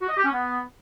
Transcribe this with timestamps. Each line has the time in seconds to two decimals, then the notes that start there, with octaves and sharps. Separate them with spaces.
0.01 F#4
0.09 D#5
0.17 G4
0.25 C#4
0.33 B3